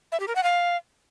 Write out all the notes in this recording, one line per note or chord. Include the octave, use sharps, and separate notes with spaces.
E5
G4
A#4
F#5
F5